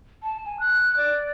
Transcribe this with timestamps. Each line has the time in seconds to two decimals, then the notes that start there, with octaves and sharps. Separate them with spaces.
0.23 A5
0.46 G#5
0.60 F#6
0.97 D5